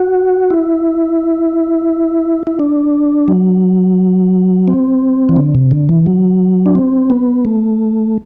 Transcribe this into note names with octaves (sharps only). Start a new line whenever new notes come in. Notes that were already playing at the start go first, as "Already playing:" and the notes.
Already playing: F#4
E4
E4
D4
F#3
C4
E3
D3
C3
D3
E3
F#3
D4
C4
B3
A3